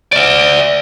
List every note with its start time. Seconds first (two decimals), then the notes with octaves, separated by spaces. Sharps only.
0.12 D5 E5